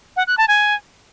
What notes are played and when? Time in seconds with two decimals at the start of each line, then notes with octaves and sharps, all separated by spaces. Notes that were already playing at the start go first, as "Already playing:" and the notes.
0.16 F#5
0.27 F#6
0.38 A5
0.48 G#5